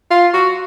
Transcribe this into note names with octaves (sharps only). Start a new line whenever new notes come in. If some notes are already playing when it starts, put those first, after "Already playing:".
F4
F#4